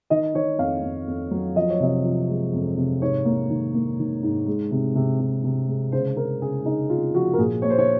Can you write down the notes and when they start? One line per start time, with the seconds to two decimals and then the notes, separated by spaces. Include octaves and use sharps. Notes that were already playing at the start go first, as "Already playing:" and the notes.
0.10 D#3 D#5
0.34 D#3 C#5
0.58 F2 F5
0.83 F2
1.07 F2
1.31 F#3
1.56 F3 D#5
1.70 C#5
1.80 C3 D#5
2.04 F3
2.29 G#3
2.53 F2
2.77 C3
3.02 G#2 C#5
3.25 A#3
3.50 D#3
3.74 A#3
3.99 D#3
4.23 G#2
4.46 G#3
4.71 C3
4.95 C3
5.20 C3
5.44 C3
5.68 G#3
5.92 C#3 C5
6.16 C#3 A#4
6.42 C#3 G#4
6.65 C#3 D#4
6.90 C#3 F4
7.14 F3 F#4
7.33 A#4
7.38 A#2 G#4
7.62 A#3 C#5
7.70 C5
7.78 C#5